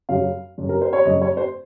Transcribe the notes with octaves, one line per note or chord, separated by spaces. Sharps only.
F#2 C#3 F#3 F5
F#2 C#3 F#3
A#4
C5
C#5
F#2 C#3 F#3 D#5
C#5
C5